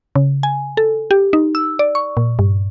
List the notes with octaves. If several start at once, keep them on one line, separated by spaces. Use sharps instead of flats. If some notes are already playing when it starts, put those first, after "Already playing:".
C#3
G#5
A4
G4
D#4
E6
D5
C#6
A#2
G2